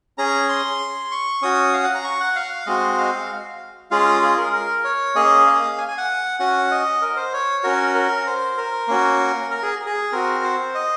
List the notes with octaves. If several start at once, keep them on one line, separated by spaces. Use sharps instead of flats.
C#4 G#4 A#5
C6
C#6
C#4 F#4 D#6
F5
F#5
A#5
C#6
F#5
F5
G#3 C4 F#4 D#5
F5
G#3 C#4 F4 G#4 F5
G#4
A#4
A#4
C#5
A#3 C#4 G#4 D#5
F5
G#5
G#5
F#5
C#4 F#4 F#5
D#5
A#4
C5
C#5
C#4 F#4 A#4
A#4
C5
A#4
A#3 C#4 F#4
A#4
G#4
G#4
C4 F#4 A#4
C5
D#5